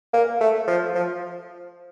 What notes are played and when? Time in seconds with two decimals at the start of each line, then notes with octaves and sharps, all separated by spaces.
0.13 A#3
0.41 A3
0.68 F3
0.95 F3